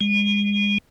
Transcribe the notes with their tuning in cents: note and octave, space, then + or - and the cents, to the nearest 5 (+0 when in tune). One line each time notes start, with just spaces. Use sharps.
G#3 -30